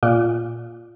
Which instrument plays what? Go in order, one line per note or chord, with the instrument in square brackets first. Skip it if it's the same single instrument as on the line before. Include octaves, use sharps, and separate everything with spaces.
[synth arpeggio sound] A#2